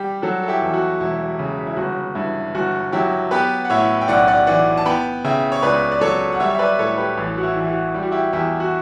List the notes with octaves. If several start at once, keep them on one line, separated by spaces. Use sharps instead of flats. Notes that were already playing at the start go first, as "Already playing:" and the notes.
Already playing: G3 G4
F#3 F#4 A4
A4
E4 G4
E2
F#4
E1 E4
C#3
E4
G1 F#4
G2 E4
G1 F#4
F#3 E4 G4
B3 G4 B4
F#5
A2 C#5 E5
G5
B1 D5 F#5
D5 F#5
E3 D5 F#5
A5
B3 G5 B5
C#3 E5 G5
C#5
C#2 B4 D5
D5
F#3 A4 C#5
F#5
G3 C#5 E5
E5
B4 D5
A2 A4 C#5
G4 B4
A1
F#4
E4
E3 E4
F#4
G3 G4
F#4
E4 G4
E2 E4 G4
F#4